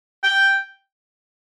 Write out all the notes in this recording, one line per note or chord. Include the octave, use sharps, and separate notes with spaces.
G5